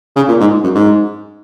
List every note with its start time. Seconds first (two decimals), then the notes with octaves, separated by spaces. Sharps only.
0.16 C#3
0.28 A#2
0.40 G#2
0.64 F#2
0.75 G#2